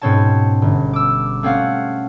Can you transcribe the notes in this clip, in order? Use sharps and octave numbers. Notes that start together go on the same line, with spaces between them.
G#2 B2 C4 C#4 C#5 A5
G1
D6 E6
A3 C4 C#4 F5 F#5